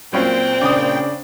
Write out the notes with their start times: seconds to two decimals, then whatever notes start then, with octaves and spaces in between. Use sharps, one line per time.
0.13 A#2 F#3 C4 C#4 F4 G5
0.61 C#3 D4 D6 D#6